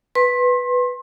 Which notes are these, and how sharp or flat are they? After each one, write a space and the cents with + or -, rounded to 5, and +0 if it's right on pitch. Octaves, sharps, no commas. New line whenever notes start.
B4 +0 C6 +30